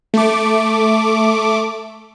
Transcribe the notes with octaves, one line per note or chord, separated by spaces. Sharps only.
A3 D6